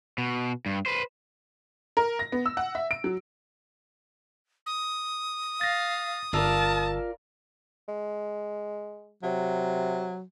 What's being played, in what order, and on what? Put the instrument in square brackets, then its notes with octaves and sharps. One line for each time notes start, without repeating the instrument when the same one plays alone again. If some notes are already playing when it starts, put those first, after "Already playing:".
[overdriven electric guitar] B2
G2
B4 C5
[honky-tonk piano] A#4
A#6
B3
E6
F#5
E5
D7
F#3
[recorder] D#6
[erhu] F5 [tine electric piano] A6 A#6
[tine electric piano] G1 E6 [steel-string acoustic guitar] F4 A#4 D5 [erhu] A5
[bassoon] G#3
[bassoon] C3 [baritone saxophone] F#3